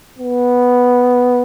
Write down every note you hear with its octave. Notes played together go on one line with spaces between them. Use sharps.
B3